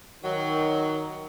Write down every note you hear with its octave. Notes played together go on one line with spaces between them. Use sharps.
D#3 F#3